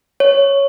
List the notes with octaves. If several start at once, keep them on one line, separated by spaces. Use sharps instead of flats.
C#5